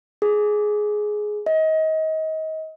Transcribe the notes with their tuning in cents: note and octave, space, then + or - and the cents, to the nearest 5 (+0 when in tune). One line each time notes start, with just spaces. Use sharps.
G#4 +10
D#5 +30